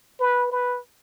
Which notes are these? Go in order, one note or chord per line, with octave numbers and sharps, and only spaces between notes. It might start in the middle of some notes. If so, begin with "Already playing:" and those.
B4
B4